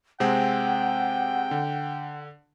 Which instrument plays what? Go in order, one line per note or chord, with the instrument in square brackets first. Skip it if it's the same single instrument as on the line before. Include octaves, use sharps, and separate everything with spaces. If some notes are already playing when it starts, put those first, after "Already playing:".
[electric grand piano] C3 G#3 C4 [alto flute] F#5 [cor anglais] G5
[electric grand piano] D3